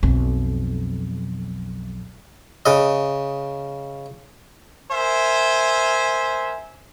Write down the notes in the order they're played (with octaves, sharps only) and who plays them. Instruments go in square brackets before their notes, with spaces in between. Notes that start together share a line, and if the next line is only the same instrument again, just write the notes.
[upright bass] B1 F2
[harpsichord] C#3 D#5
[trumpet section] A#4 C5 E5 G#5